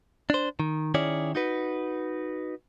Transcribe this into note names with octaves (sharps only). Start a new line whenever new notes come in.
D4 C5
D#3
D#3 C#4 E4 G#4 C#5 D5
D#4 F#4 B4